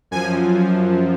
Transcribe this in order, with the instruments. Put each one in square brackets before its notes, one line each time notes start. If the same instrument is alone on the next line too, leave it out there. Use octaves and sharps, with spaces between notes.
[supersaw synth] F#2 F3 G#5